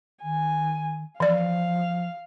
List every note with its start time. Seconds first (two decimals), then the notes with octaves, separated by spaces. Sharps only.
0.23 D#3 G#5
1.20 E3 F3 D5 F5